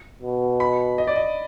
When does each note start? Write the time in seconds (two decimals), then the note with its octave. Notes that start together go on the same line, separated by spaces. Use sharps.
0.22 B2
0.60 B5
0.98 D#5
1.07 D5
1.16 D#5